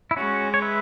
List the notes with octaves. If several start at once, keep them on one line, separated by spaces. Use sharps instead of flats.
E4
G#3 C#4 F#4
C#5
B4 E5